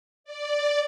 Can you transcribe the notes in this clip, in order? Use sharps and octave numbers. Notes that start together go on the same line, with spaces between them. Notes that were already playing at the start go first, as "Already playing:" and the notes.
D5